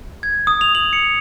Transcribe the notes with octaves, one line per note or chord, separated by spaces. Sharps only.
G#6
D#6
F7
F#7
C#7